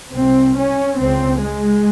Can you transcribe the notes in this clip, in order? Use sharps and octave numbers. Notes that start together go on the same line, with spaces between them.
C2 C3 C4
C#4
C#2 C#3 C4
G#3